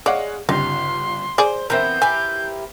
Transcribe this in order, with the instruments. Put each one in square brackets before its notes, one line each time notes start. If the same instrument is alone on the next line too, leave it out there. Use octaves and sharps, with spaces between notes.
[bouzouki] G#3 [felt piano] C#5 F5 F#5 [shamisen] D5
[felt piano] G1 C#3 G4 [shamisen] D#4 [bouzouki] F4 [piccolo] C6
[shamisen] G#4 D5 [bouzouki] C5
[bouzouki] E3 B3 C4 [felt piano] A#4 C5 E5 [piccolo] G6
[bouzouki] E4 G4 B4 [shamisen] G#5